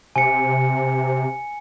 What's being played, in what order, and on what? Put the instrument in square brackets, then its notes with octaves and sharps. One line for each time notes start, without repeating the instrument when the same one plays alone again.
[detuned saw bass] C3 [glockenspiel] G#5 C#7